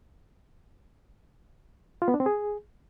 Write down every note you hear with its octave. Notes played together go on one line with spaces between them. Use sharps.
F4
B3
D4
C4
G#4